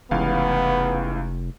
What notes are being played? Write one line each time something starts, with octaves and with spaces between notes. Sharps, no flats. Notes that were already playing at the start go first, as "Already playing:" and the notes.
F1 C#2 E3 B3 F5